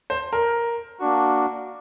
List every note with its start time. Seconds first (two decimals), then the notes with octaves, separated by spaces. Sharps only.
0.10 C5
0.33 A#4
0.99 A#3 D4 F#4